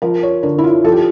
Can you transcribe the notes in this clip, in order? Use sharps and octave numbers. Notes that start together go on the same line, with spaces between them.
F3 A#4
C#5
D3 A#4
E4
F4
F3 A4
G4